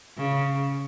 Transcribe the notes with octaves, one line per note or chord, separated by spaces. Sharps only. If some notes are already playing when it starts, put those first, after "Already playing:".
C#3